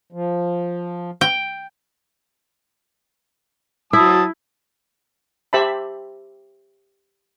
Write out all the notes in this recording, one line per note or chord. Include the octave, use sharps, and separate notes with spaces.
F3
G5
F#3 E4 A5 D#6
G4 C5 E5 A5 B5